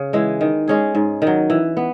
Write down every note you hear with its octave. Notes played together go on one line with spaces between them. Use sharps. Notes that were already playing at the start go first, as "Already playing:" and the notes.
Already playing: C#3
E3 G#3
D#3
G#3 C#4 G#4
G#2
D#3
F#3
E3
B3